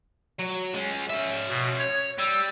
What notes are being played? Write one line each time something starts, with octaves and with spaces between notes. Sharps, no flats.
F#3
G#3 C#4
C#4 E5
B2
C#5
G3 E6